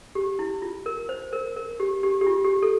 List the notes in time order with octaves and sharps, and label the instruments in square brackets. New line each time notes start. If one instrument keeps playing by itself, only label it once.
[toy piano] G4
E4
F4
A#4
C5
A#4
A#4
G4
G4
G4
F4
G4
A4